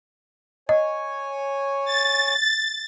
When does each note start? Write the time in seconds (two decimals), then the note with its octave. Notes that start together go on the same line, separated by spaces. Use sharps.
0.69 C#5 D#5 G#5
1.85 A6